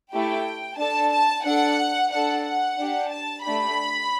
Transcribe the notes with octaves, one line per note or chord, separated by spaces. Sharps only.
A3 E4 G4 G5
D4 A4 A5
A5
D4 A4 F#5
D4 A4 F#5
F#5
D4 G4
A5
A3 D4 G4 B5